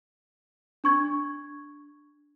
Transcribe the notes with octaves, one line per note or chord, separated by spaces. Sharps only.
D4 C#6 G#6